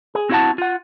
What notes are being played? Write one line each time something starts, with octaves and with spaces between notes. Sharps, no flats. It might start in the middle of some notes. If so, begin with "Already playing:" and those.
G#4
C4 E4 F#4 E5 F#5 A5
F4 F#5